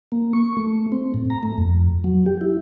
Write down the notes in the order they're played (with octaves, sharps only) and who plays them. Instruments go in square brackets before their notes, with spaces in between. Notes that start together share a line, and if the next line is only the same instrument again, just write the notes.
[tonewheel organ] A#3
C#6
A3
C4
A2
A#5
A3
F2
F#3
G4
E4